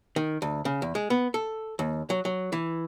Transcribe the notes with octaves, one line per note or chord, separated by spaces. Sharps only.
D#3
D2
C#3
E2
G#3
B3
A4
D#2
F#3
F#3
E3